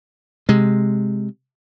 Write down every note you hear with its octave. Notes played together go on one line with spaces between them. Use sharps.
C3 G#3